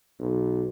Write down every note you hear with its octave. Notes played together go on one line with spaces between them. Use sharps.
B1